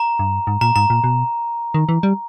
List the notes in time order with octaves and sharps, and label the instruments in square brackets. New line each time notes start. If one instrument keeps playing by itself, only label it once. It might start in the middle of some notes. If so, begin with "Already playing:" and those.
Already playing: [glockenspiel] A#5
[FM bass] G2
G#2
[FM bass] A#2 [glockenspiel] A#5
[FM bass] G#2 [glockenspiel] A#5
[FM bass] A#2
B2
D#3
E3
G3